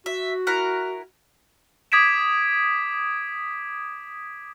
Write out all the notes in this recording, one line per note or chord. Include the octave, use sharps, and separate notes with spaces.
F#4 E5
E4 A#4 F#5
D6 D#6 G#6 B6 D7 E7